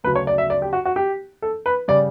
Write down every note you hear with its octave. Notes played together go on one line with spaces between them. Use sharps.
D2 C#3 F#3 B4
C#5
D5
E5
D5
G4
F#4
F#4
G4
A4
B4
C#3 G3 D5